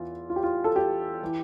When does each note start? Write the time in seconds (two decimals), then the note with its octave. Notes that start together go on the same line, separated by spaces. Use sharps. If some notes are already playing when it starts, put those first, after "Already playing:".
Already playing: E2 E3 F4
0.30 F4
0.36 G4
0.43 F4
0.64 A4
0.76 G4
1.23 E3